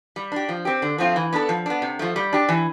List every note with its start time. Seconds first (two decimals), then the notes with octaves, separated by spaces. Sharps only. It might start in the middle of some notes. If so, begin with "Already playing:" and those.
0.16 G3
0.32 D4 G4
0.49 F3
0.65 C4 G4
0.82 D3
0.98 F3 A3 C4 F4
1.16 E3
1.33 B3 D4 A4
1.49 F3
1.66 B3 D4
1.82 C3
1.99 F3 A3
2.16 G3
2.33 D4 G4
2.49 E3